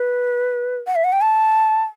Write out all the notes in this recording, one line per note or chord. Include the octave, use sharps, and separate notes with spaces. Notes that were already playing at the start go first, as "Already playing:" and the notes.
Already playing: B4
F#5
E5
F#5
G5
A5